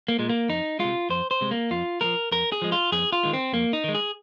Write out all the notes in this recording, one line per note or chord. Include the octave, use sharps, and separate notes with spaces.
A#3
A#2 G#3
A#3
F2 D#4
C3 G#3 F4
F2 C5
C5
C3 G#3
A#3
F2 F4
F3 G#3 A#4
F2 A#4
G#4
F3 G#3
F4
F2 G#4
F4
D#3 G#3
C4
F2 A#3
D#4
D#3 G#3
G#4